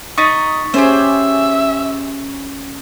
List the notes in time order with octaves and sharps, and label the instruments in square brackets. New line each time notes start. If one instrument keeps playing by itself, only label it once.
[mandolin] D#4 D#5 [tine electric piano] C#6 A6 B6
[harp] C#4 [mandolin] G4 G#4 C5 [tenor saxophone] E5